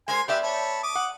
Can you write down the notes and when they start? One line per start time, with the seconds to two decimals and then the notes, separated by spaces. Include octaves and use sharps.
0.08 G#3 A#4 C5 G#5
0.28 B3 G4 B4 D5 E5
0.43 C#5 A5 B5
0.83 D6 D#6
0.95 F#5